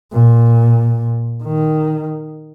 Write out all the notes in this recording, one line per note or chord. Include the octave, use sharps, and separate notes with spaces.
A#2
D#3